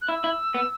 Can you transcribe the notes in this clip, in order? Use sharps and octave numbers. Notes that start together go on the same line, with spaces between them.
F#6
E4 E6
E4
B3